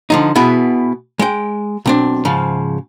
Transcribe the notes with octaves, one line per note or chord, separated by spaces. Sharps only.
D3 F3 D#4
B2 B3 E4 G#4
G#3 G5
B1 C4 D4
G#2 C#3 F3